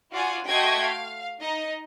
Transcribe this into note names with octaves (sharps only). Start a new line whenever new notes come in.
F4 F#4 D5 F#5 G#5
A3 F#4 D#5 G5 C6 G#6
F5
D#4 D#5